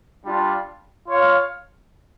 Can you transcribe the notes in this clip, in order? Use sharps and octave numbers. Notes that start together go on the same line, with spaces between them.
G3 D4 F4
F4 C#5 F5